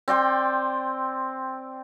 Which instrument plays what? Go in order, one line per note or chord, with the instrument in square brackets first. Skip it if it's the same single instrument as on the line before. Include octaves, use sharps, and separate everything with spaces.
[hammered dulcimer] C4 D5 G5 C6